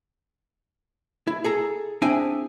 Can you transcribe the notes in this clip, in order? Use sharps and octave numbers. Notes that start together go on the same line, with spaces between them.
E4
G#4 A4 A#5
C4 D4 E4 G#4 G5 G#5